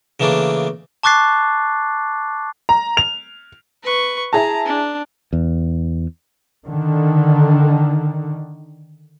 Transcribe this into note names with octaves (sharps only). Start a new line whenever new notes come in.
C#3 E3 A3 A#3 D4
A5 C#6 D6 F#6 A6 C7
A#5
F7
B4 C#6
E4 G#4 A5 A#5
D4
E2
D3 D#3